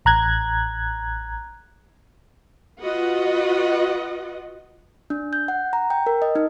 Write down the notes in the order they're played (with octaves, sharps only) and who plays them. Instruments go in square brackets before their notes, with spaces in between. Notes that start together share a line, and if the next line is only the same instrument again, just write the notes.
[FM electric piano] A1 A#5 F#6 G#6
[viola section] F4 F#4 B4 D#5 F#5
[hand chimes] D4
G6
F#5
A#5
G5
A#4
D#5
D#4